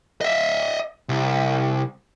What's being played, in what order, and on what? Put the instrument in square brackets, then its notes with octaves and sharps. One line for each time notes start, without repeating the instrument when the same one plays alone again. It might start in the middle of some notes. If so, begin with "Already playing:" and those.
[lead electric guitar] D#5 E5
C2